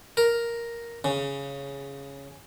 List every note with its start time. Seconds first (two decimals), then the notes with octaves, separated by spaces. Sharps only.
0.17 A#4
1.04 C#3